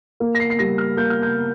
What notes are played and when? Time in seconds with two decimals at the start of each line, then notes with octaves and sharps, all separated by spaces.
0.20 A#3
0.35 A#6
0.40 C7
0.50 C7
0.59 G3 A#6
0.78 F6
0.97 A#3 G6
1.10 F6
1.22 G6